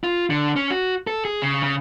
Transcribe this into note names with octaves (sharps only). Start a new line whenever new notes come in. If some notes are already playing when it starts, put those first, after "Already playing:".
F4
D3
C#4
F#4
A4
G#4
C#3
C#3